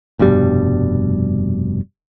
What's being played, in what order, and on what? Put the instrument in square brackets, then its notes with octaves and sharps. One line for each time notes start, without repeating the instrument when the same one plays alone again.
[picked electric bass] F1 G2 B2 G3